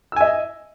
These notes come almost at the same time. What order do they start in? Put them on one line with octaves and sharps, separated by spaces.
E6 G#5 E5 D#5